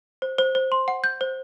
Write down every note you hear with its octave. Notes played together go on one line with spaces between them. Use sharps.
C5
C5
C5
C6
F#5
G6
C5